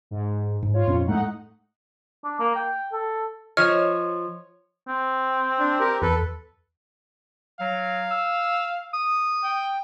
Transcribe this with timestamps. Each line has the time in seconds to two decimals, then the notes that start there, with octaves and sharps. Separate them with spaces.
0.11 G#2
0.63 G#2
0.74 F4 C#5
0.87 F2 A#2 C#4
1.07 A2 G#3 A3 D#4 F#5
2.24 D4
2.40 A#3
2.55 G5
2.93 A4
3.57 F3 C#5 D#5 F6
4.88 C4
5.59 D4
5.80 G4 A#4
6.02 E2 A4 B4
7.61 F#3 F5
8.11 E6
8.93 D#6
9.44 G5